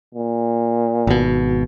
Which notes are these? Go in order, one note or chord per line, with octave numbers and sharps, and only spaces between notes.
A#2
G#1 B2